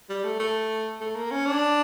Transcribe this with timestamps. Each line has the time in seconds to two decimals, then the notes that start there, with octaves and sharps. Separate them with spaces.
0.09 G3
0.24 A3
0.39 A3
1.00 A3
1.16 A#3
1.31 C#4
1.46 D4